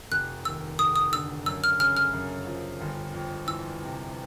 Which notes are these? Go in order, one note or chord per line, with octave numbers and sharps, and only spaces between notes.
F1 F#6
D#2 E6
F1 D#6
D#6
D3 E6
F#2 E6
F6
C#3 F6
F6
F#2
F3
G1
F2
E3 E6
C3